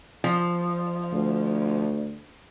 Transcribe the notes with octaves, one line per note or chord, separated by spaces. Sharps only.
F3
D2